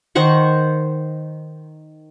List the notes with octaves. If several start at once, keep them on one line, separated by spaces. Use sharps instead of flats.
D#3 C5 F#5 C#6